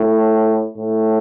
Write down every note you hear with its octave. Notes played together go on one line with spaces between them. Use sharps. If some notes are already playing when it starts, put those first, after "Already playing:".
Already playing: A2
A2